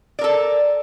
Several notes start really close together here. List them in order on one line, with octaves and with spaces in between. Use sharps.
D5 A#4 A4